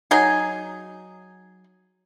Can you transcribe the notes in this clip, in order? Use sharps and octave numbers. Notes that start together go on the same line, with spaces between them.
F#3 D#4 G#4